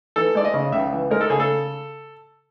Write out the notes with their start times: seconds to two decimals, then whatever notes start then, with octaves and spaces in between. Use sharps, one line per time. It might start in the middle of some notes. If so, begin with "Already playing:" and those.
0.16 E3 A4
0.35 G#3 D5
0.45 D#5
0.54 C#3
0.72 C#2 E5
0.93 E3
1.11 G#3 A#4
1.21 A4
1.30 C#3 G#4
1.40 A4